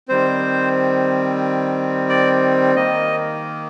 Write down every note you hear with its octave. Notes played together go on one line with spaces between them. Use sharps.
D#3 G3 C4 C5
D5
D#3 A#3 D#5